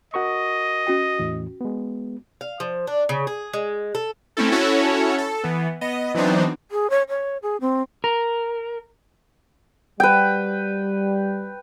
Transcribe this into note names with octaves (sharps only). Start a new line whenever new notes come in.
F#4 A#4 D#5 C#6
C#4 F#4 G5
E2 A2 E3
G#3 B3
F5
F3
D4
C#3
G#4
G#3
A4
A3 C4 C#4 E4 A4
C#4 E4 F#4 A4 C#5
A4
E3 B3
B3 D#5
E3 F#3 B3 C4 D4 D#4
G#4
C#5
C#5
G#4
C4
A#4
G3 B4 G5